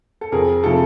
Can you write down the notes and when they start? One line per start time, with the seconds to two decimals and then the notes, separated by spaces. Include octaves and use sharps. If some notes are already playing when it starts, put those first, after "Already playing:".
0.21 A4
0.32 F2 G#4 A#4
0.64 C3 F3 A3 A4